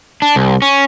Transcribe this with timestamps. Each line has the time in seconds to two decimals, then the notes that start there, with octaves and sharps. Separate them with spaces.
0.22 D4
0.36 C2
0.62 C#4